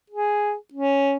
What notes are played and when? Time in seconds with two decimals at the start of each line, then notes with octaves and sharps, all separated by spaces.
0.10 G#4
0.74 C#4